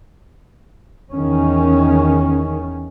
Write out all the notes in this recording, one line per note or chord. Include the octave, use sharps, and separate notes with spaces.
E2 D#3 C#4